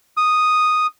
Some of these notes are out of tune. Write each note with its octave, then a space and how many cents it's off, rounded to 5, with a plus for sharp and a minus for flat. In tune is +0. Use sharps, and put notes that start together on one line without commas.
D#6 -5